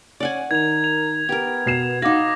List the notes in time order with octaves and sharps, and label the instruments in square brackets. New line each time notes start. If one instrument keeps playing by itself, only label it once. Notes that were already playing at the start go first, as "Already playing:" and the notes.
[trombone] C#4 [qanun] D5 F#5 G#5
[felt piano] D#3 [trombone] A#4 [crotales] G#6 F7
[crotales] F7
[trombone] B3 [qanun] G4 A#4
[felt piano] B2 C7 E7
[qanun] D#4 B4 [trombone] F#4 [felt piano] F5 [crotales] D6 A#6